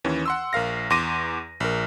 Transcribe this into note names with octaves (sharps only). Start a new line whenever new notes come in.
D#2 E3 C#4
F#5 C6 E6
A#1 A#4 F5 A#6
E2 C6 D6 A#6 D#7
A#1 A#4